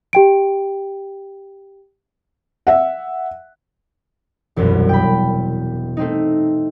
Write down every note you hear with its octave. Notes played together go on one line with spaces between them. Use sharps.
G4 G5 D7
E5 F#5
E1 C2 F#2 B2
G5 B5
A3 C4 D#4